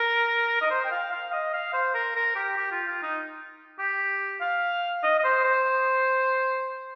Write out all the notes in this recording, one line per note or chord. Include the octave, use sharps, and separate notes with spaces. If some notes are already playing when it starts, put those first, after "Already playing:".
Already playing: A#4
D#5
C5
G5
F5
F5
D#5
F5
C5
A#4
A#4
G4
G4
F4
F4
D#4
G4
F5
D#5
D#5
C5
C5